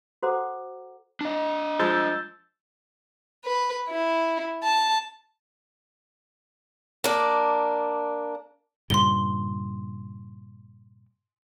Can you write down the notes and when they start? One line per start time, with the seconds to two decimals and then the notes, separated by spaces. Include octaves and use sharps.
0.23 F#4 A4 C5 F#5 A#5 D6
1.21 D4 D#5
1.79 F3 G#3 E6 G6 A6
3.45 B4
3.89 E4
4.63 A5
7.04 A#3 D4
8.90 G2 A#2 C#3 C6 G7